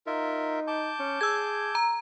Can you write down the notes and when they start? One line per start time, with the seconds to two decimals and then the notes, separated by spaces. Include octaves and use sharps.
0.06 D#4 F4 A#4 E5
0.67 A5 D6 G6
0.99 C#4
1.21 G#4 E6 G#6
1.75 A#5